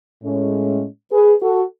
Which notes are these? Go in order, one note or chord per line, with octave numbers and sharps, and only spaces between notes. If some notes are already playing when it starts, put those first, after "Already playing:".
A2 G#3 C#4
G#4 B4
F#4 A4